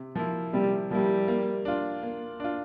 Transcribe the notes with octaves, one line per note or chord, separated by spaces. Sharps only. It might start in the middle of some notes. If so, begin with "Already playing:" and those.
Already playing: C3
F3 A#3 E4
C3 G3
F3 G3 A#3 E4
A#3
D4 F4
A#3
D4 F4